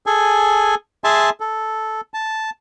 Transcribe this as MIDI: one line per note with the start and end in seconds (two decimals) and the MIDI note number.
0.06 0.75 68
0.06 0.75 69
0.06 0.75 80
1.04 1.30 68
1.04 1.30 76
1.04 1.30 80
1.04 1.30 81
1.04 1.30 84
1.40 2.01 69
2.14 2.50 81